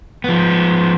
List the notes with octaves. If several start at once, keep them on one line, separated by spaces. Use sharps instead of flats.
F3 B3